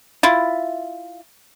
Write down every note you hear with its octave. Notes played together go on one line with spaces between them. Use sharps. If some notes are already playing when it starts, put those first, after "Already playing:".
E4 F4